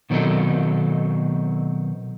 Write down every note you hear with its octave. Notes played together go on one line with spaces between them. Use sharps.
B2 D#3 F#3 C4 D#4 A4